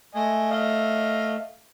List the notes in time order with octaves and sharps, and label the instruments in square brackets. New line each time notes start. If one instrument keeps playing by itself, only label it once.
[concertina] A3 [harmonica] D#5 G#5
[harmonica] D#5 F5